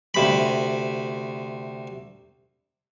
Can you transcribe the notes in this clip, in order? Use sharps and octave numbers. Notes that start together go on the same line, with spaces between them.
D2 C3 B5